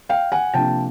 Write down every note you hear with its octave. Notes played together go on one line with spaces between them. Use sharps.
F5 G5
F#5 G#5
C3 F3 A#3 D4 G5 A5